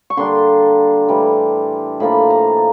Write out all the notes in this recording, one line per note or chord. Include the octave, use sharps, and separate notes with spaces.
C#6
D3 G3 A#3 D4 C6
A2 E3 G3
A2 F3 A#3 D4 B5
A#5